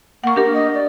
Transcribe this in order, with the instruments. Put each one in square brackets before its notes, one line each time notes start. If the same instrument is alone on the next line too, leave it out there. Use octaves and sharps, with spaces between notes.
[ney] A#3 [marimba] F#5 C#6
[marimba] D4 G4 A#4
[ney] D#5
D5